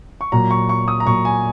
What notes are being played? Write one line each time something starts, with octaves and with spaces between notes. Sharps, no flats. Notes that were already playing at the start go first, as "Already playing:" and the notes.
C#6
A#2 F#3 A#5
C#6
C#6
D#6
A#5
A#2 F#3 C#6
G#5